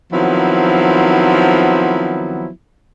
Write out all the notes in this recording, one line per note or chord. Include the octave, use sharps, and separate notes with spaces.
D#3 F3 F#3 B3 C4 E4